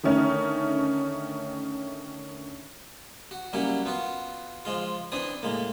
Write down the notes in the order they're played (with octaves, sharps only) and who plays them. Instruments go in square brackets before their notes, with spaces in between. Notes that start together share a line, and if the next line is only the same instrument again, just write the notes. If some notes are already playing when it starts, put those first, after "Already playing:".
[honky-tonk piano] D3 D#3 A3 C#4 D#4
[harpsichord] F#4
F#3 G3 A#3 C#4 E4 F#4
B3 F4 F#4
F3 G#3 F4
E3 C4 D4 E4 D#6
A2 G#3 A#3